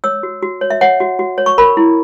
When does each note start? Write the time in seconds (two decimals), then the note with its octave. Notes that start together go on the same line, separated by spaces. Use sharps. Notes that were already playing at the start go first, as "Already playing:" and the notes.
0.04 C#5 E6
0.23 F#4
0.43 F#4
0.61 C#5
0.70 E5
0.81 C#5 F#5
1.00 F#4
1.19 F#4
1.38 C#5
1.46 C#6
1.58 A#4 B5
1.77 E4